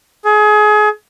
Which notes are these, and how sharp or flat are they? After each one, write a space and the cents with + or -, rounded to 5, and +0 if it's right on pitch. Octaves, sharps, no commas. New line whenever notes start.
G#4 +30